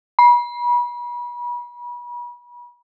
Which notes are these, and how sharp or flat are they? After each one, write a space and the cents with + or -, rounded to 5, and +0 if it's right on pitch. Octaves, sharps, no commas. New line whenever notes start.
B5 -35